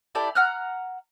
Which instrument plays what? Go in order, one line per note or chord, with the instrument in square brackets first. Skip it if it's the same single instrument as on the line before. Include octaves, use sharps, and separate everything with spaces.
[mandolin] E4 G4 A4 D5
F#5 A#5 F6 F#6